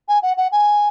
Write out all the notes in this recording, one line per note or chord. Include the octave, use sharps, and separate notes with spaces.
G#5
F#5
F#5
G#5